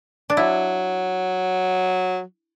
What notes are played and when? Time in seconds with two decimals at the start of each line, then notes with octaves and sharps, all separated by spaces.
0.30 D4
0.37 F#3 E4